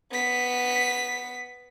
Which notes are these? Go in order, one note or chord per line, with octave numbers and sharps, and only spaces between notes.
B3 B6